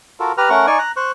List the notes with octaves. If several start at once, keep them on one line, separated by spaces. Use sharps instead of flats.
F4 F#4 A4 A#4
G4 B4 A#5 F6
A3 C#4 A#4 F#5 C#6
D#4 D5 G#5 C#6
A#5 F#6
C5 C#6 F#6